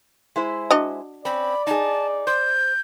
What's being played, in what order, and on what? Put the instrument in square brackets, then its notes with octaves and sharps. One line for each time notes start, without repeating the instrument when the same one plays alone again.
[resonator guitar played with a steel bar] G#3 E4 C5
[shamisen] D4 F#4 D#5
[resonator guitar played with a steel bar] C4 C#4 [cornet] D5 [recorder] B5
[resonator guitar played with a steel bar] D#4 G#4 [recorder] A5
[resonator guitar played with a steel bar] C5 [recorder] G6